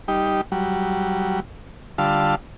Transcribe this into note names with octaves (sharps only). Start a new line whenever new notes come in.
G3 D#4 G4
F#3 G3
D3 G3 F4 F5 A5 E6